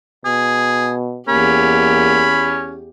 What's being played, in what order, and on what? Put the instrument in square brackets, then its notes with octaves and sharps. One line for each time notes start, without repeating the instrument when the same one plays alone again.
[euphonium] B2 [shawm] G#4
[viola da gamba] E2 G4 [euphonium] A#3 [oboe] C#4 [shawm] B5